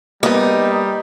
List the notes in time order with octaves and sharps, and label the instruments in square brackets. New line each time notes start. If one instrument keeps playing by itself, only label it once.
[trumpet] G3 [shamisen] A#3 B3 [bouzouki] D#4